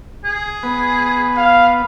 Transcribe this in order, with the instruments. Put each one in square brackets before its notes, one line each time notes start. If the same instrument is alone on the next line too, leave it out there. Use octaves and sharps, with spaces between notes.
[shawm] G#4
[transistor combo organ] B3
[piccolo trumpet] F5